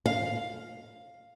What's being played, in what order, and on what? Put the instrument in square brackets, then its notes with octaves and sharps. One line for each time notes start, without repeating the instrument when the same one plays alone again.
[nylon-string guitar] F5